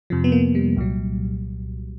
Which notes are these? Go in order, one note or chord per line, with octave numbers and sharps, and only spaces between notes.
F2 C3 F3
B3
A#3
G3
C2 A#2 F#3